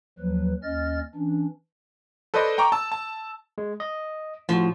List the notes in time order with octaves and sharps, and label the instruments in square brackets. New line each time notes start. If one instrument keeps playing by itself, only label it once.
[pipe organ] D#2 F3 F#3 B4
D#2 C#4 D#5 F6 A6
E3 C#4 D4
[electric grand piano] A4 B4 C5 D5 D#5 C6
G5 A#5 C#6 D6
A5 E6
A5
[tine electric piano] G#3
D#5
[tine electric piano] A2 F#4 [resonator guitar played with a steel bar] F3